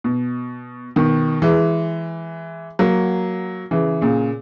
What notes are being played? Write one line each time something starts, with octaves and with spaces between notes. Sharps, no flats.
B2
B2 D#3
E3 G#3
F#3 A#3
C#3 E3
A#2 C#3